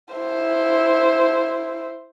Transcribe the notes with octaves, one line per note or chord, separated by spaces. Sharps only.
E4 C5